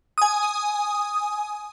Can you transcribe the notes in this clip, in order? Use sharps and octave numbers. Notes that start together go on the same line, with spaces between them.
G#5 D#6